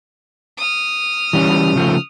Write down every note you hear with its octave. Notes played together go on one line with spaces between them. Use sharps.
D#6 F6
E3 G3 C#4
C#3 F3 A3